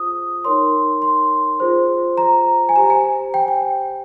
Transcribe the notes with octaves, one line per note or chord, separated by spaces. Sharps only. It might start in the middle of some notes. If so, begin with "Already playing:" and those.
Already playing: F4 G#4 C5 D#6
D#4 A#4 C#5 C6
C6
F4 G#4 C5
A#5
G#5
G4 C5 A#5
G#5
G5
G5